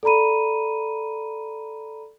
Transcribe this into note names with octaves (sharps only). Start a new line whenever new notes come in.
A4 D5 A#5 B5 D#7